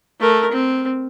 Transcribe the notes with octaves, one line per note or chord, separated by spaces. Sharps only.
A3 A#4
C4